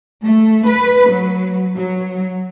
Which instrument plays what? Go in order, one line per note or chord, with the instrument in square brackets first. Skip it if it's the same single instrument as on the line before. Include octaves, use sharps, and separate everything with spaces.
[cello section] A3
B4
F#3
F#3